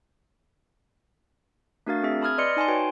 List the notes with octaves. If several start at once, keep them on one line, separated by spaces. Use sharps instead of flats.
A3 D4 F#4 A#4 F5 A6
C4 G#4 E5
A5 B5 D#6 F6 G#6
B4 D5 D#5 C6 G#6 C#7
D#4 G#5 A5 C6
F#4 B4 C#5 G5